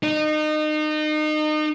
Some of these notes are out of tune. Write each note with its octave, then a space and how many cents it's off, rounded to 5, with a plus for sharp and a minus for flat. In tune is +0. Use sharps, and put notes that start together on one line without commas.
D#4 -30